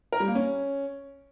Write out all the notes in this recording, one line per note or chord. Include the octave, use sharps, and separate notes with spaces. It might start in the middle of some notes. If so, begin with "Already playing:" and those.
A#4
G3
A#3
C#4